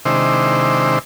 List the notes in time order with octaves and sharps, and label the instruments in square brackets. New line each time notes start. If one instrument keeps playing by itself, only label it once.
[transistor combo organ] C3 D#3 G#3 D4 E4 C5